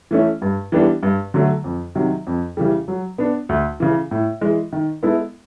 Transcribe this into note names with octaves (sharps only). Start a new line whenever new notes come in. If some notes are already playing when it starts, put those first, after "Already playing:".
E3 A3 C#4
G2
E3 G3 B3 D4
G2
D3 F#3 A3
F2
C3 D#3 F#3
F2
C#3 E3 G3
F#3
B3 D4
D2
C#3 E3
A2
E3 G#3
D#3
G#3 B3 E4 A4